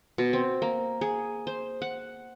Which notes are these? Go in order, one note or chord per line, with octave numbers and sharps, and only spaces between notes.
B2
C4
A#3
G#4
C5
F#5